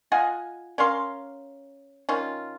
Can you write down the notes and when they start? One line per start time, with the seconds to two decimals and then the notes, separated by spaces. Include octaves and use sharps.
0.12 F4 D#5 F#5 G#5
0.78 C#4 A#4 F5 C6
2.09 D#3 C#4 F4